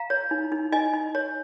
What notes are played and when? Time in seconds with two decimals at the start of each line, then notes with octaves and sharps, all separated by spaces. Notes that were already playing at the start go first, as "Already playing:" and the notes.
Already playing: F5 A#5
0.10 C#5
0.31 D#4
0.52 D#4
0.72 D#4 D#5 G#5
0.93 D#4
1.15 C#5